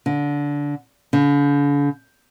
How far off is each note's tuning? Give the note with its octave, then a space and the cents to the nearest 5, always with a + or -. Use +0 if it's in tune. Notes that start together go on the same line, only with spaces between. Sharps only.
D3 -20
D3 -45